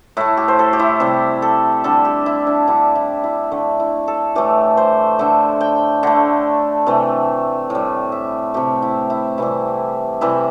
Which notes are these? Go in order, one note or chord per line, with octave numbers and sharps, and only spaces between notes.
A2 A3 E4
G4
C5
A4
G4
E4
C3 G3
A4
D3 G3 A4
G4
E4
D4
D3 G3 E4
E4
E4
D3 A3
E4
A4
A2 E3 A3 G4
C5
D3 A3 E5
G5
D3 A3
C3 E3 A3
A2 G3
E5
C3 A3 G4
E4
E4
C3 E3 G3 E4
C3 E3 G3 E4